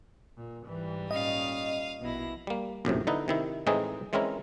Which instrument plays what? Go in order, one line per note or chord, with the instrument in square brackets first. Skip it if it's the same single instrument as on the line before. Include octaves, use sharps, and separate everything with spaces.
[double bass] A#2
[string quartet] G#2 G3 [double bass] E3
[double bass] A#2 C#4 [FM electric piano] D#5 [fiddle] F5 D#6
[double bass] A#1 [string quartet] B2 E4 A#6
[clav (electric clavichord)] G3 A#3
A#1 F#2 A2 C3
D3 D#4 E4 B4
C3 D#3 E4
A2 E3 G#3 C4 D#4 G#4
E3 G#3 C4 C#4 E4 A#4